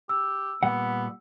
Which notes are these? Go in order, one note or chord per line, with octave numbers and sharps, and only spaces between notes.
G4 E6
A#2 G3 B3 F#5